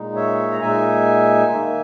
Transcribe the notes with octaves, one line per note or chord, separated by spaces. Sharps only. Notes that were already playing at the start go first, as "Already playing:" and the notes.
Already playing: A#2 G#3 D#4
C#5 E5
A#5
A#2 G#3 D#4 E5 G#5
D#3 A#3 D#4